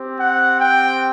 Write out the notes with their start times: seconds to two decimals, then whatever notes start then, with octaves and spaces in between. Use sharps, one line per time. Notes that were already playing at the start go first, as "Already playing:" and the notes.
Already playing: C4 G4
0.19 F#5
0.60 G5